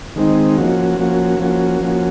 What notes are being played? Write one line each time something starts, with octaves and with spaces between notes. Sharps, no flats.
D#3 G#3 C4 D#4
F3 A#3 C#4 F#4
F3 A#3 C#4 F#4
F3 A#3 C#4 F#4
F3 A#3 C#4 F#4